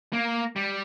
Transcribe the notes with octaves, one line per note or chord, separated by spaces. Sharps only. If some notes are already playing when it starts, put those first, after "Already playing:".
A#3
G3